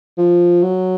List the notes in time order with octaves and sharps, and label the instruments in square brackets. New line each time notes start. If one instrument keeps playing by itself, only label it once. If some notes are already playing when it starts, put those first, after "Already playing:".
[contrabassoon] F3
F#3